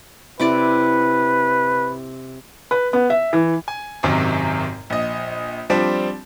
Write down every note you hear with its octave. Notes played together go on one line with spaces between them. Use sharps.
C3 E4 B4 D5
B4
B3
E5
E3
G#5
G#1 F#2 C3 D#3
A#1 D#5
F3 G3 C4 D4